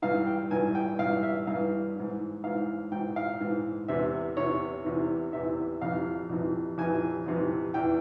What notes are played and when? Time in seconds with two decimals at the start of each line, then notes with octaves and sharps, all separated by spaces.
0.02 G2 E3 F5
0.27 G5
0.51 G2 E3 G#5
0.75 G5
0.99 G2 E3 F5
1.23 E5
1.47 G2 E3 F5
1.96 G#2 E3
2.43 G#2 E3 F5
2.92 G#2 E3 G5
3.16 F5
3.40 G#2 E3
3.88 E2 C3 E3 E5
4.37 E2 C3 E3 C#5
4.85 E2 C3 E3
5.33 E2 C3 E3 E5
5.82 F2 C3 E3 F5
6.30 F2 C3 E3
6.78 F2 C3 E3 G#5
7.26 F2 C3 E3
7.74 E2 E3 G5